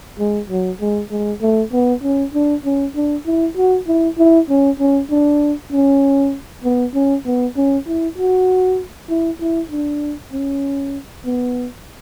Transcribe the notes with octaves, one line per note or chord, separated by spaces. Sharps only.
G#3
F#3
G#3
G#3
A3
B3
C#4
D4
C#4
D4
E4
F#4
E4
E4
C#4
C#4
D4
C#4
B3
C#4
B3
C#4
E4
F#4
E4
E4
D4
C#4
B3